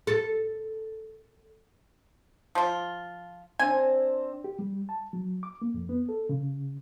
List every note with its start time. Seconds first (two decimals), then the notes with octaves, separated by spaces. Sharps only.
0.07 A4
2.55 F3 F4
3.59 C4 D4 G#5
4.44 G4
4.59 G3
4.89 A5
5.13 F#3
5.43 D6
5.62 A#3
5.74 F2
5.89 B3
6.09 A4
6.29 C#3